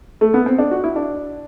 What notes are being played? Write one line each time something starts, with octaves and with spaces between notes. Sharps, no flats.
A3
B3
C4
D4
F#4
E4
D4